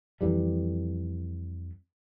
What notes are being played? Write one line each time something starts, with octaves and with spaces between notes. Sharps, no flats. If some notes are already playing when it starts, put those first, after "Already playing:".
F2 E3 G3